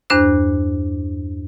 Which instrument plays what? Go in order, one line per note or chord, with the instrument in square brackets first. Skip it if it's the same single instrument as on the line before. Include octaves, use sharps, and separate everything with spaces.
[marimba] E2 G2 D4 C5 F#6